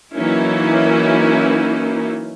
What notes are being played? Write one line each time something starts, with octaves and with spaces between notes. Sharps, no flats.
E3 F#3 A#3 C#4 D#4 E4